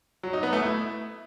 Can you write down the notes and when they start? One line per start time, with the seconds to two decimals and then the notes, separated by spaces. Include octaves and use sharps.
0.23 F#3
0.33 D#4
0.43 B3
0.53 A3
0.62 E4